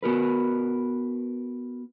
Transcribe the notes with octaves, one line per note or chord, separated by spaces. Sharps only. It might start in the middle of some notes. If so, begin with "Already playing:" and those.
B3 F#4 A#4 B4